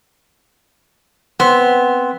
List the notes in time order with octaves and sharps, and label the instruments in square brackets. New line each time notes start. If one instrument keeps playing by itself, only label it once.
[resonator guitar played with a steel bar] B3 [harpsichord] C4